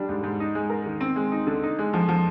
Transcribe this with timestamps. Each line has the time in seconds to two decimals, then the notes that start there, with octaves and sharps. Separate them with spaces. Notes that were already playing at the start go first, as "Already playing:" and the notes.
Already playing: D3 G3 D4
0.09 G#2
0.23 G#2
0.40 D#4
0.55 G#3
0.70 A#4
0.86 D#3
1.01 C4
1.16 G#3
1.32 D#4
1.47 D3
1.63 D#4
1.79 G#3
1.93 F3
2.08 F3